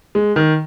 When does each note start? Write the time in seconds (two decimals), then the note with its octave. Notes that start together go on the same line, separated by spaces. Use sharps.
0.15 G#3
0.36 D#3